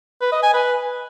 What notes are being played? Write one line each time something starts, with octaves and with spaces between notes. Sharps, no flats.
B4
D#5
G#5
B4